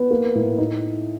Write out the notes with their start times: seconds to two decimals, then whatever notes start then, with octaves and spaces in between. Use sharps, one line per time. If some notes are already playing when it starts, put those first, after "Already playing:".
Already playing: B3
0.11 A#3
0.35 A2
0.58 D#4